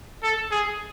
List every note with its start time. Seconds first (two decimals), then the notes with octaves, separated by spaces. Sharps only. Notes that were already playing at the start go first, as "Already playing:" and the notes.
0.23 A4
0.51 G#4